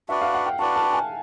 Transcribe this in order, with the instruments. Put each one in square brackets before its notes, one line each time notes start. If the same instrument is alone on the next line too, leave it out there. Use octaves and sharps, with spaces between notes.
[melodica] D4 F#4 B4 D5 [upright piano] E5
[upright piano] F5
F#5
G5
[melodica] D4 F#4 B4 D5 [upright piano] A5
[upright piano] A5
G#5